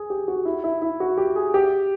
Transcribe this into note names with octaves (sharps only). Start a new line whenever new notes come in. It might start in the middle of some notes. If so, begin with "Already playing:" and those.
Already playing: G#4
G4
F#4
E4
E4
E4
F#4
G4
G#4
G4